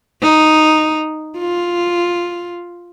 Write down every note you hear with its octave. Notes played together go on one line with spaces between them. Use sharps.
D#4
F4